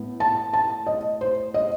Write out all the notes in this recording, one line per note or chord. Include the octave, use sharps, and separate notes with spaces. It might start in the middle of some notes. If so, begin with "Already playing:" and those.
Already playing: A2 B3
A5
A5
D#5
C5
D#5